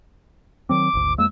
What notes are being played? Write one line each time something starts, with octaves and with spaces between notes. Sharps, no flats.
D#3 F#3 C4 D6
G#1 D2
F2 G#3 A#3 E6